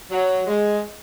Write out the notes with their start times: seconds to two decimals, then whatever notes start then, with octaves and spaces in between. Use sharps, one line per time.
0.11 F#3
0.47 G#3